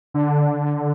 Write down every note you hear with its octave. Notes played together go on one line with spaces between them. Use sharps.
D3